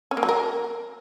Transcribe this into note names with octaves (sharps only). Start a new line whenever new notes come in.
C#4
A#3
F#3
A#4